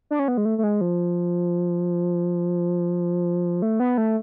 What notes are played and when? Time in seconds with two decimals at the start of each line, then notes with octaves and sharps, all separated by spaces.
0.11 D4
0.19 C#4
0.28 B3
0.37 G#3
0.45 A3
0.58 A3
0.63 G#3
0.81 F3
3.62 A3
3.80 B3
3.98 A3